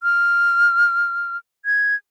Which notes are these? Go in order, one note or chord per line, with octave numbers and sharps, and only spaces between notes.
F6
G#6